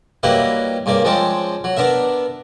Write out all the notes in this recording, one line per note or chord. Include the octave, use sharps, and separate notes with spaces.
F#3 G3 A#3 E4 B4 D#5
G2 C#3 A#3 D5
F3 G#3 C4 C#4 D5
F#3
B3 D4 A#4 E5